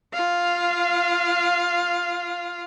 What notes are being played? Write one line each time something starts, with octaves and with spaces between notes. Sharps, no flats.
F4 F5